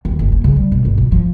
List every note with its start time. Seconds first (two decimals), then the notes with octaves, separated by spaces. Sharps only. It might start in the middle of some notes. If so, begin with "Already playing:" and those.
0.05 D#2
0.19 F#1
0.32 A#3
0.44 C#3
0.56 G3
0.72 B2
0.85 G#1
0.98 B2
1.12 F3